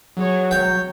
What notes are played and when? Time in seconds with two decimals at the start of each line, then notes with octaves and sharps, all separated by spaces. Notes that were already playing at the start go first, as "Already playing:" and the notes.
0.17 F#3 G#4 C#5
0.51 C#5 G5